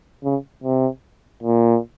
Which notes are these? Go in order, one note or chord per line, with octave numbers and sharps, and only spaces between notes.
C#3
C3
A#2